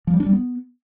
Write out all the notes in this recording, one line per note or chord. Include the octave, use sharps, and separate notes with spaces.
F3
G3
D4
G3
B3